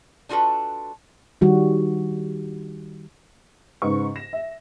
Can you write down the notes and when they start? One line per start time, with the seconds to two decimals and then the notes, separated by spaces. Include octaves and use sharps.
0.29 D4 F4 F#4 A4 B4
1.41 D#3 G3 F#4
3.82 G#2 C#3 B4 C#6
4.16 A#6 E7
4.33 E5